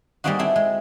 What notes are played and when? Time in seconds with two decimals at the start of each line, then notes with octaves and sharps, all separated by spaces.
0.24 G3 G#3 A#3 C4 D#4 F#4
0.39 C4 E4 A4
0.56 G#3